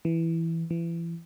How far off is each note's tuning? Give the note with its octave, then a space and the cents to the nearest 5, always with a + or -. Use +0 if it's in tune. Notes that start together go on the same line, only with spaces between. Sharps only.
E3 +0
E3 +30